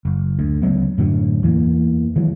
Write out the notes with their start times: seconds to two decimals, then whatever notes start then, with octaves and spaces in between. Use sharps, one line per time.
0.05 F#1
0.39 D2
0.62 C#2 F#3 B3
0.98 F#2 A2 D3 F#3
1.43 E2 E3 G3 A#3
2.16 D#3 E3 F#3 G#3